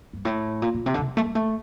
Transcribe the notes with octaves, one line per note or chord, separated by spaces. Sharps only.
G2
A2
A#2
A#2
C3
D3
C3
F3
A3
G3
A3